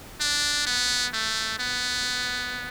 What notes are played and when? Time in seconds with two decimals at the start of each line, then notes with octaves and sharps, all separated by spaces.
0.20 D4
0.66 B3
1.13 A3
1.59 B3